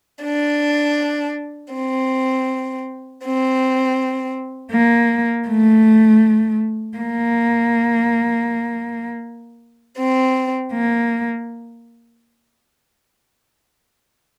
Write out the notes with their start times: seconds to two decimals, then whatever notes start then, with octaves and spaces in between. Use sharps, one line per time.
0.22 D4
1.72 C4
3.23 C4
4.72 A#3
5.48 A3
6.97 A#3
9.98 C4
10.73 A#3